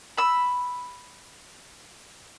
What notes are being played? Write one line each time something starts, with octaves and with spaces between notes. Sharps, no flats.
B5 E6